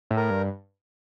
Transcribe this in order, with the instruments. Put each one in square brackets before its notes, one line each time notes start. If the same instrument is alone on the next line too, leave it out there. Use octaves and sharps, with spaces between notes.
[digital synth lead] A2
[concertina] A#4
[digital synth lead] G2